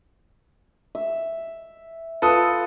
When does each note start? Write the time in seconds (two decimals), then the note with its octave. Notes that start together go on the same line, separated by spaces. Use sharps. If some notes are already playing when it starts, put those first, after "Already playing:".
0.95 E5
2.22 F4 A4 B4 D#6